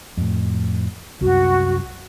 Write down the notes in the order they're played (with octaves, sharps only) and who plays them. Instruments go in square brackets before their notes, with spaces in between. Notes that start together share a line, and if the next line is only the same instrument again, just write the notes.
[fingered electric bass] F2 A2
[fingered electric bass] C2 F#2 [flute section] F#4